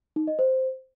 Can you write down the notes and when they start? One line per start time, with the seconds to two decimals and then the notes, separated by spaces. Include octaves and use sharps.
0.16 D#4
0.27 D#5
0.39 C5